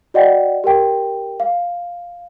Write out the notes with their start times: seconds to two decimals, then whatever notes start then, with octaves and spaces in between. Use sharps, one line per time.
0.14 F#4 D5 D#5 F#5 G5
0.64 G4 A#4 G5
1.40 F5